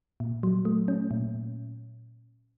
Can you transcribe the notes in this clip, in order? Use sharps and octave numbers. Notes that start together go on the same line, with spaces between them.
A#2
F#3
A3
C#4
A#2